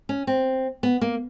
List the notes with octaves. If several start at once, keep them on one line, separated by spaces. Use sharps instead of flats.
C#4
C4
B3
A#3